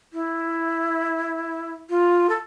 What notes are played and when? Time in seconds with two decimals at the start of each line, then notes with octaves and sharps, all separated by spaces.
0.13 E4
1.90 F4
2.29 A4